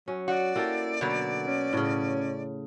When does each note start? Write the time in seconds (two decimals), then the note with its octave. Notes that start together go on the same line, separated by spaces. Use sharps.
0.08 F#3 C#4
0.28 F#4 D5
0.56 A#3 E4 G4 A4
1.01 B2 D3 F#3
1.47 C#4
1.73 A2 C#3